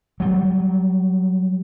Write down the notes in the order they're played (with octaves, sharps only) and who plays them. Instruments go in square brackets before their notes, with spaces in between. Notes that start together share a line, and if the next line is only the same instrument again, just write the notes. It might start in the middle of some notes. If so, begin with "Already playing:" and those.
[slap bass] F#3 G3